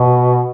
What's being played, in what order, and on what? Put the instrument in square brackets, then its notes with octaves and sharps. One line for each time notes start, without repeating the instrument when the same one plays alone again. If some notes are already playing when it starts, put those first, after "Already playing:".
Already playing: [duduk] B2